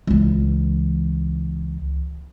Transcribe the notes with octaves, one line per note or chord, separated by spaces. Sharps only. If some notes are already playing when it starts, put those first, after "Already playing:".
C#2 E3